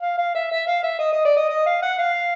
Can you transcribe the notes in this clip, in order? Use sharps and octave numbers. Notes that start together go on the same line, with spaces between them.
F5
F5
E5
E5
F5
E5
D#5
D#5
D5
D#5
D#5
F5
F#5
F5